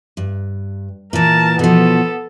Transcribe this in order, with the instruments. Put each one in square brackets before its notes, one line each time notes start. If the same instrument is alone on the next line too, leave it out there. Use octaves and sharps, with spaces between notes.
[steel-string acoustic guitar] G2
[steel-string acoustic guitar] A#2 E3 [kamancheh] A#4 A5
[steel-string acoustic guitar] B2 F3 [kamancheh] B3 A4